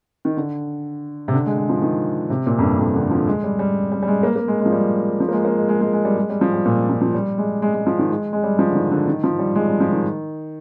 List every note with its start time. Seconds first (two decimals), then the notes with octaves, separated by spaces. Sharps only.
0.25 D#3
0.37 D3
1.28 C3
1.33 D3
1.46 G#3
1.58 G#3
1.69 F3
1.82 D#3
2.30 C3
2.46 A#2
2.59 F2
2.62 G2
2.79 F2
2.95 D3
3.11 F3
3.27 G#3
3.44 G3
3.59 G3
3.92 G3
4.02 G3
4.08 G#3
4.23 A#3
4.36 A#3
4.48 G#3
4.60 G#3
4.66 F3
4.72 G3
5.20 F3
5.29 A#3
5.33 G#3
5.45 A#3
5.57 G#3
5.69 G#3
5.81 G#3
5.93 G#3
6.05 G3
6.17 G#3
6.29 G3
6.41 F3
6.54 G3
6.65 A#2
6.89 F3
7.01 F3
7.14 G3
7.38 G#3
7.62 G#3
7.74 G#3
7.87 F3
7.99 D#3
8.11 G#3
8.33 G#3
8.43 G3
8.59 F3
8.69 D3
8.75 D#3
8.91 D3
9.07 D#3
9.24 F3
9.39 G3
9.55 G#3
9.68 G3
9.80 F3
9.92 D#3